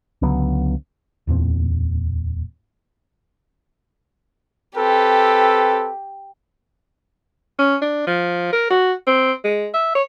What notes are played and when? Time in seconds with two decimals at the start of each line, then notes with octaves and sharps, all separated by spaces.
0.22 C#2 D3 F#3 B3
1.27 D1 E2 A#2 C4
4.76 C4 G4 A4 B4
7.59 C#4
7.82 D4
8.07 F3
8.52 A#4
8.70 F#4
9.07 C4
9.44 G#3
9.74 E5
9.95 C#5